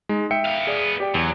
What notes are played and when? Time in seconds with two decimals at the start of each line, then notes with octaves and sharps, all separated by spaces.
0.09 G#3 D#4
0.31 E5 G5 C#7
0.46 B3 F5
0.67 G#4 D5
1.00 G4 D5 G5
1.15 E2 F#3